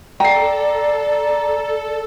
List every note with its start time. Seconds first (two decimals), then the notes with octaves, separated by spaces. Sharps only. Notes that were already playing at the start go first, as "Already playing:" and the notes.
0.20 A4 D5 G5 A#5 C7